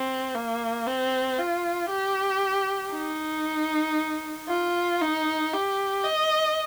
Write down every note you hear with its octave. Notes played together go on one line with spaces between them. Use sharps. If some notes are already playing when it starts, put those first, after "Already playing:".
Already playing: C4
A#3
C4
F4
G4
D#4
F4
D#4
G4
D#5